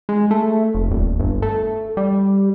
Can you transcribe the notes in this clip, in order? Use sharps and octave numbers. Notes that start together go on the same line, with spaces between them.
G#3
A3
F1
D#1
G1
A3
G3